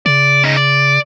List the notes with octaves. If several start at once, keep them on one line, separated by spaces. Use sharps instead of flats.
C#3 D5
C#4 D#4
D5